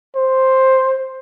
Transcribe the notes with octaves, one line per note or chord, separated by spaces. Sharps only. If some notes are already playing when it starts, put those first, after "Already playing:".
C5